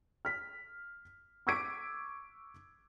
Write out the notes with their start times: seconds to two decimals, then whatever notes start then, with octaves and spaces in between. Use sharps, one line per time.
0.25 F6 B6
1.47 C#6 D6 E6 G#6 B6 D7